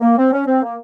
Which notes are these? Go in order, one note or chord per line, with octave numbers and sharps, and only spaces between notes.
A#3
C4
C#4
C4
A#3